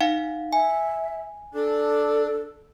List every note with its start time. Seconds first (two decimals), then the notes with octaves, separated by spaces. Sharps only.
0.01 D#4 F5 F#5
0.53 E5 G#5
1.54 D4 A4